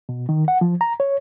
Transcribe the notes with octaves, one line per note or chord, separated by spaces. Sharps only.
B2
D#3
F#5
F3
A#5
C#5